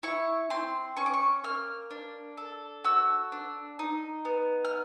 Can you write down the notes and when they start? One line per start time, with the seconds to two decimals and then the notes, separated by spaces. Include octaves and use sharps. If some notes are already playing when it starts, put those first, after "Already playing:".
0.03 E4 C#6
0.50 C4 C6
0.97 C#4 C#6
1.06 D6
1.14 C#6
1.44 A#3 F6
1.91 D4
2.37 A4
2.84 F#4 E6
3.32 D4
3.79 D#4
4.25 B3
4.65 F6